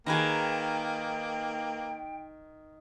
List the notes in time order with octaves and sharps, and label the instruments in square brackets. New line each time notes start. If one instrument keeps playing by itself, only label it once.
[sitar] D#3 [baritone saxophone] A#3 [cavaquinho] G#4 B4 A#5 [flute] G5